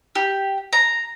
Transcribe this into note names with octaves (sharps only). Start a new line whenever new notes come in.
G4
A#5